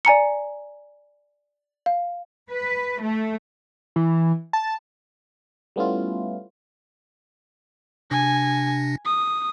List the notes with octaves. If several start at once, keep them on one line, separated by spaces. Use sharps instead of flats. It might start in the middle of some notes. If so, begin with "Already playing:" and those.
D5 G#5 A#5 C#7
F5
B4
A3
E3
A5
G3 A3 B3 C#4 E4 F4
C3 D4 G#5 A#6
D#6